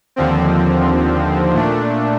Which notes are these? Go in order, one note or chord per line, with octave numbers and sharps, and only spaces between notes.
D#2 D3 F3 C4
A#2 A3 D4